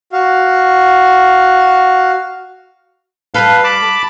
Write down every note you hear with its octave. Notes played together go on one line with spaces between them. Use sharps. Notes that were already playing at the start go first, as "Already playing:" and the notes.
F#4 F5
G3 A4 B4 F5
A5 B5 D6